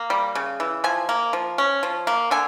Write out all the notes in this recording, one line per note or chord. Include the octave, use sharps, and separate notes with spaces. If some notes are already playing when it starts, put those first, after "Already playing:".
Already playing: A#3
G3
C#3
E3
F3 G#5
A#3
F3
C#4
F3
A#3
D3 G#5